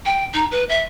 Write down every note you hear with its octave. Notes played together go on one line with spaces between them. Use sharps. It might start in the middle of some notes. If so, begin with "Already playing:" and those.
G5
D#4
B4
E5